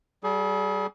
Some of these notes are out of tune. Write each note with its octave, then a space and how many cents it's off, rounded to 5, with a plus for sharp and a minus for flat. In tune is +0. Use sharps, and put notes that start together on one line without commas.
G3 -20 G#4 +35